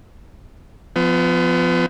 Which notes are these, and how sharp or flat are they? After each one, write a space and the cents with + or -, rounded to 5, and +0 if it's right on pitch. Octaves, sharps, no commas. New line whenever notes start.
F3 -5 B3 +30